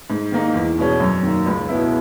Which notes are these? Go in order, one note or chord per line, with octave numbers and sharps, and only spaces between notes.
G#2
D#3 A#3 D#4
E2
B2 G#3 C#4
F#2
D#3 A#3
C#2
B2 G#3 B3 E4